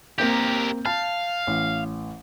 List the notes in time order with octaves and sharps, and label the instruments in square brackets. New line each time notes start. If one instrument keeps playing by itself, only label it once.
[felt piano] A#3 C4 G6 [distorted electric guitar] G4 A#4
[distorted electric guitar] F5 [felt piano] A5
[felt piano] A1